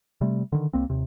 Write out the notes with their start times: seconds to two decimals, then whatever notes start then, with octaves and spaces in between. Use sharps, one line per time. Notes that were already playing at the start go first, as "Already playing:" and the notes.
0.21 C3 G3 A3
0.52 D3 D#3
0.73 C2 A#3 C4
0.90 D#2 C3